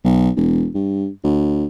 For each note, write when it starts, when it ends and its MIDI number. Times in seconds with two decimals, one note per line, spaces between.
0.04 0.30 35
0.36 0.68 28
0.75 1.08 43
1.24 1.66 38